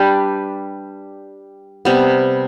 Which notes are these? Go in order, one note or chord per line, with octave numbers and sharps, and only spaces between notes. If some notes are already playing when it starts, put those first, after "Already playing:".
Already playing: G3 D4 G4 B4
C3 G3 B3